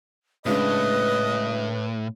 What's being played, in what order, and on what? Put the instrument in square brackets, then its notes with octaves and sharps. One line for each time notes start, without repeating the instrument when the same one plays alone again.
[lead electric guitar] A2 [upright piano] C#3 G#3 D4 [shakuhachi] B4 [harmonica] D#5